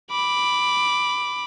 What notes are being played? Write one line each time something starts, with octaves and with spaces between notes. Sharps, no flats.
B5 D6